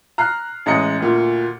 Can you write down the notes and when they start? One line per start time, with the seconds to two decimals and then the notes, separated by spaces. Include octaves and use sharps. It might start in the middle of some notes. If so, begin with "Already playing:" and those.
0.18 A#5 F6 F#6 C7
0.66 A1 G#3 D#5 A#5 C#7
1.00 D2 A#2